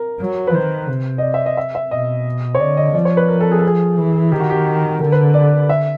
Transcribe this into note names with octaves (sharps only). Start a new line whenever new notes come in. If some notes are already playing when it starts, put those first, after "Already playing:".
Already playing: A#4
F#3
B4
D#3 C5
C3
D#5
D5
E5
D#5
E5
E5
B2 D#5
C#5
D3 D5
D#5
F3 D5
C#5
B4
A#4
A4
G#4
A4
G#4
E3
D#3 G4
F#4
G4
D3 A#4
B4
D5
E5